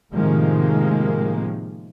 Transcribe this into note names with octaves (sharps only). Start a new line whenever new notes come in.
A2 C3 D#3 F3 G#3 A#3